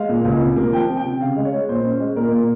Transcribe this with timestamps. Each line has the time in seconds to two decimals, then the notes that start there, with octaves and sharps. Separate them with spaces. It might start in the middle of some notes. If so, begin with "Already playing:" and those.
Already playing: G#3 F5
0.09 A#2
0.25 C#2
0.41 C3
0.56 A#3
0.73 F3 G5
0.89 C3
0.97 G5
1.05 C3
1.20 C#3 F5
1.36 G#3
1.45 C#5
1.52 G#3
1.69 A#2 C5
1.85 C#4
2.00 G#3
2.16 A#2 A#4
2.32 A#2